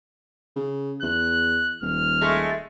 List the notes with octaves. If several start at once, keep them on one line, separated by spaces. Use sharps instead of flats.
C#3
E2 F#6
D#1 F6
G#3 A3